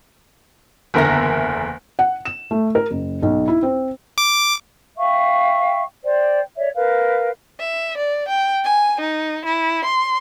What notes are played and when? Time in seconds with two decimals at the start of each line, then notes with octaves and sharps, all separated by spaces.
0.94 F#1 E2 D3 A#4 E5 A#6
1.99 F#5
2.25 E7
2.51 A3
2.75 A#4
2.91 F#1
3.23 B1
3.48 E4
3.63 C4
4.18 D6
4.98 E5 F5 G5 C#6
6.03 C5 D5 G5
6.56 C#5 D5 E5
6.75 A#4 B4 F5
7.60 E5
7.98 D5
8.29 G5
8.64 G#5
9.01 D#4
9.45 E4
9.85 C6